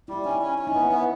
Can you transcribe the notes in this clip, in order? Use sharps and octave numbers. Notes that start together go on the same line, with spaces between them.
G3 E4
C#4 D#4
C#4
C#4
D#4
B3 E4
B3